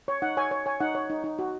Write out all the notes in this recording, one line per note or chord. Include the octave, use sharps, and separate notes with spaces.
C#5
D#4 F#5
C#5 G#5
C#5
C#5 G#5
D#4 F#5
C#5
D#4
D#4
F#4